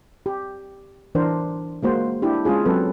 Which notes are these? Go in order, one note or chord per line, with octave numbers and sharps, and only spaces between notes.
G4
E3 D4 A#4 C5
G#3 A#3 F#4 C5
D4 E4 G4
G#3 C#4 F4 G#4
F#3 C4 A4 B4